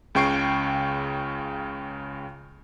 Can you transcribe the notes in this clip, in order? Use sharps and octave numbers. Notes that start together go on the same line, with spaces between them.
C#2 C#3 G5 C#6 C7 D7